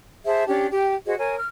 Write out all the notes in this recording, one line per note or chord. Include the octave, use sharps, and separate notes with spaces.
G#4 C5 E5 A5
C#4 D4 G4
G4 G5
F#4 G#4 C5 D#5
A#4 C#5 G#5
F6